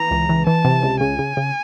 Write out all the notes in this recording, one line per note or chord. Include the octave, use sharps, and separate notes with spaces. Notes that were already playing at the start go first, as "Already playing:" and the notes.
Already playing: E3 A#5
C#2
E3
E3 A5
C3
C#2
C#3 G#5
C#3
C#3